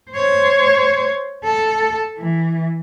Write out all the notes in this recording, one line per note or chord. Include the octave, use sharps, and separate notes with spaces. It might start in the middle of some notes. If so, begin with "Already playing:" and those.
C5 C#5
A4
E3